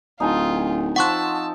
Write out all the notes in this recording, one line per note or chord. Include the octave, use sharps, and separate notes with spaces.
D1 D#4 F4 G#5 A5
F3 C4 F#5 A5 C#6 E6 F#6